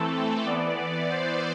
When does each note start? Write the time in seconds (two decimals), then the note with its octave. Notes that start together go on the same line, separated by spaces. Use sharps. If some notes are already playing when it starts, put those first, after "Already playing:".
Already playing: E3 A3 C4 A4
0.45 E3 B3 D5
1.11 C5